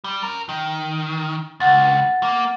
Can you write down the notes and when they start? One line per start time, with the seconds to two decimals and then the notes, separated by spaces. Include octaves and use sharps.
0.04 G3
0.23 C#4 A#4
0.49 D#3
1.60 C#2 F#5 A6
2.23 A#3